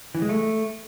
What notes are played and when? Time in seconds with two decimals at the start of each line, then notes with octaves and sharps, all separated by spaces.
0.15 E3
0.22 G#3
0.29 A3